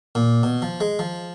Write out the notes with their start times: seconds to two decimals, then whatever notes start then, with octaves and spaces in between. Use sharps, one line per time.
0.15 A#2
0.43 B2
0.62 F3
0.81 G#3
0.99 F3